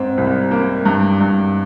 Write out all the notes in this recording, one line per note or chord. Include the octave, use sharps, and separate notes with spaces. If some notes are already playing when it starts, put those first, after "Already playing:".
Already playing: G#2 C4
C2
A#3
G2
G2